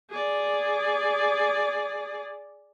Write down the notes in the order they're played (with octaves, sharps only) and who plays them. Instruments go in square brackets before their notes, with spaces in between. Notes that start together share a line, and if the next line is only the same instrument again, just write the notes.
[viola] G#4 D5